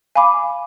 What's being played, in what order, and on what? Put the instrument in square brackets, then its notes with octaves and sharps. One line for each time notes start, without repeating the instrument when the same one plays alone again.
[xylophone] F5 G#5 B5 D6